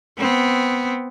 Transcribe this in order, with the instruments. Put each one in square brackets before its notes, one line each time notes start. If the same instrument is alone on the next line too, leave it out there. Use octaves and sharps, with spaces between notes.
[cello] B3 C4